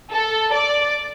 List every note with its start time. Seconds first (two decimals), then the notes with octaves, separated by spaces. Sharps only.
0.12 A4
0.53 D5